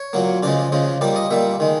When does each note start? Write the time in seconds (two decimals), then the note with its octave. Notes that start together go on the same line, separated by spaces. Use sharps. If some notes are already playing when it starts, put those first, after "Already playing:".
Already playing: C#5
0.13 A#2 F#3 A#3
0.43 C#3 F3 G#3 D5
0.72 C#3 F3 G#3
1.01 A#2 G3 A#3 D5
1.16 D#5
1.31 A#2 G3 A#3 E5
1.60 D#3 G#3